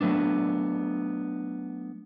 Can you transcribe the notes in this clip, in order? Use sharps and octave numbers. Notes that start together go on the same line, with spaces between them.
F#3 A3 B3 D4